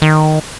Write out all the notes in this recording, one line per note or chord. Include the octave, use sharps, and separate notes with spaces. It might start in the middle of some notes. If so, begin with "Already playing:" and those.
D#3